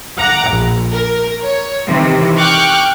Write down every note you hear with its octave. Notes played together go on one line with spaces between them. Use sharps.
F#5 A#5 D6
A#1
A#4
C#5
C3 D#3 E3
G5 C#6 D6 F6 F#6